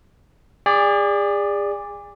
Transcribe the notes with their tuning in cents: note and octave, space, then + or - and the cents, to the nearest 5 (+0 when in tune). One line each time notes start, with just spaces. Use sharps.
G#4 -35 D5 +0